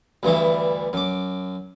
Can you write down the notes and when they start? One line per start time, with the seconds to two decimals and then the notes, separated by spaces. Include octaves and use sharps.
0.23 D2 G2 E3 D4
0.93 F#2 D6